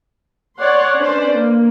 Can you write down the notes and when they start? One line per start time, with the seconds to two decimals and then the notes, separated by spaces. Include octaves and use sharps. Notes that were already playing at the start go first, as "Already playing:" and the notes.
0.58 C#5 D5 F#5 C6
0.99 C#4 D4 B4 C5 D5
1.33 A#3